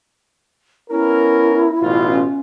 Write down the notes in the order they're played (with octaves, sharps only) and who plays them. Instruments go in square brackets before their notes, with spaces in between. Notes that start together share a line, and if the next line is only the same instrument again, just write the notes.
[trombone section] B3 C#4 A#4 [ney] E4
[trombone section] A1 B2 F4
[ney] C#4